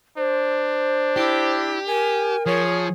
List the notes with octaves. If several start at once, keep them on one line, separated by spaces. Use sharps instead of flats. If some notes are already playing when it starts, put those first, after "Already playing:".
D4 C5
E4 G4
A#4 G#5
F3 G#4 C#5